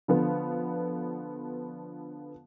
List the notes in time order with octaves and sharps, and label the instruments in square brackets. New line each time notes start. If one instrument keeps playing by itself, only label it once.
[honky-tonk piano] D3 F3 B3